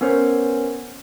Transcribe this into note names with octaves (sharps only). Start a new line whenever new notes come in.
B3 C#4 A#4 C5 C#5